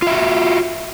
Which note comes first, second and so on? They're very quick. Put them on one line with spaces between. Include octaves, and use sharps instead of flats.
F4 E5 F#4